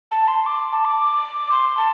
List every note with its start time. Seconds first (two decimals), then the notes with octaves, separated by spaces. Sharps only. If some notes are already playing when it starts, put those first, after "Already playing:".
0.11 A5
0.28 C6
0.46 D6
0.72 A5
0.85 D6
1.51 C6
1.77 A5